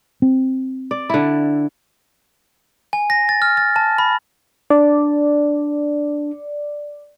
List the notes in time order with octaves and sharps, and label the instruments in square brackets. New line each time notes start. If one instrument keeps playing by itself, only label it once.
[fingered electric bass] C4
[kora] D5
D3 E4
[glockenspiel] G#5
A#6
A6
F6
A6
A5
B5
[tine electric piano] D4 [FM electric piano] D5